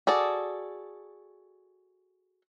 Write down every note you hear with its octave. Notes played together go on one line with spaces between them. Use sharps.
F#4 G#4 A4 D5